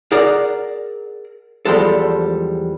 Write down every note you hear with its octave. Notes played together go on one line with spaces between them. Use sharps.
G#4 A#4 D5 F#5
E2 F3 G3 G#3 A4